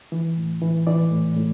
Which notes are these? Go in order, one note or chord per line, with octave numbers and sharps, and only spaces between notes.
E3
A2
E3
E3 D5
A2
A2